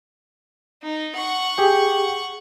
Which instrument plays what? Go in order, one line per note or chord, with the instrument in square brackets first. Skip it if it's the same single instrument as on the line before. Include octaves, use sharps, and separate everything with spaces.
[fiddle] D#4
F#5 C#6
[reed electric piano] G4 G#4 G5